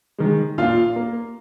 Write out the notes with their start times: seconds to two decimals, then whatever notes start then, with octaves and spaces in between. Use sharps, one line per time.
0.18 D#3 G#3
0.58 A#2 F4 F5
0.96 A#3